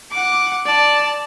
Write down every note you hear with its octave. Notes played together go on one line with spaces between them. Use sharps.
F#5 D6
D5 A5